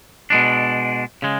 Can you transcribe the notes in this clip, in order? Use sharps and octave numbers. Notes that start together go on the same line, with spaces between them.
B2 G#3 D4
C#3 G#3